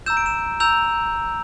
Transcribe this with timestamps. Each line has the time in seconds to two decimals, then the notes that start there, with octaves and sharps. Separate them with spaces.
0.06 A#5 E6 G6 E7
0.17 D7
0.26 E7
0.60 A#5 E6 G6 F7